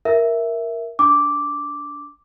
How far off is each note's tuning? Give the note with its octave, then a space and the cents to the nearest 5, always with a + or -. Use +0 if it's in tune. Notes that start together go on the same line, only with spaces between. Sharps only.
A#4 +0 E5 +0
D4 -25 D6 -5